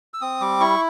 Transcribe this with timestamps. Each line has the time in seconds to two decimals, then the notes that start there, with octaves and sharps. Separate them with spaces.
0.14 E6
0.21 C4 D#6
0.41 G3 D6
0.60 E4 C#6